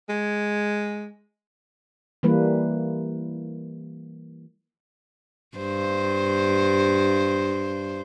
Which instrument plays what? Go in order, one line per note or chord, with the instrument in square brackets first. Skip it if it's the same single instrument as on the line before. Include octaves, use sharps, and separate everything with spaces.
[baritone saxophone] G#3
[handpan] E3 G3 A#3 B4
[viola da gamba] G2 C5